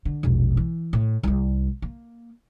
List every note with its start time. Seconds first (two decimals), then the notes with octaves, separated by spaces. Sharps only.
0.05 D3
0.23 E1 A#1
0.57 E3
0.93 A2
1.23 C2 G3
1.82 A#3